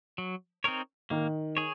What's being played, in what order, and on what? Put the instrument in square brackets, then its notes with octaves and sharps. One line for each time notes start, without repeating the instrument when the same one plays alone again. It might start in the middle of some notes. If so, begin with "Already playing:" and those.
[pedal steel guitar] F#3
C4 D#4 A#4 C#5
[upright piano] D#3 [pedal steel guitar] A#3
[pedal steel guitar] G#4 C#5